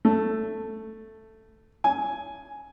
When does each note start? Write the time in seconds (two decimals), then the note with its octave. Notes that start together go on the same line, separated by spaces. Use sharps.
0.05 A3
1.84 G#5